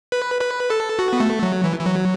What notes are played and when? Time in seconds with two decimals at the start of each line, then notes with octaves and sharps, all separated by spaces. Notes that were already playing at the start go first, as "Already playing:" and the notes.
0.12 B4
0.41 B4
0.70 A4
0.99 F#4
1.13 B3
1.20 A3
1.43 F#3
1.64 E3
1.79 E3
1.86 F#3